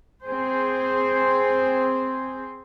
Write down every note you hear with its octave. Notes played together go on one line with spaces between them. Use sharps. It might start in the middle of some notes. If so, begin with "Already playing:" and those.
C4 G#4 C5